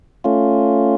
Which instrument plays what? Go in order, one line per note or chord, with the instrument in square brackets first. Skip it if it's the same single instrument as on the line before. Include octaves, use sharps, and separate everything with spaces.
[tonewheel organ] A3 C#4 F4